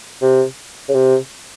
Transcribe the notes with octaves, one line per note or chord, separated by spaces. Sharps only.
C3
C#3
C3